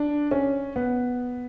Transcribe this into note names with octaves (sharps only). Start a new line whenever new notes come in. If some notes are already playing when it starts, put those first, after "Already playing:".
Already playing: D4
C#4
B3